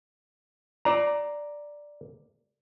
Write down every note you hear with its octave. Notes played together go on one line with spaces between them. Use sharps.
D5 A#5